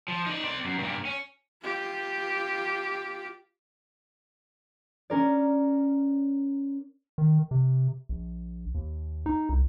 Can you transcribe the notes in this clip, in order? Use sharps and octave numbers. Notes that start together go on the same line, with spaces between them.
F3
D#4 D5
C4 D5
F#2
G2 A#2
C#4
F4 G4
C#4 A#4 D5
D#3
C3
A#1
D#2
D#4
C2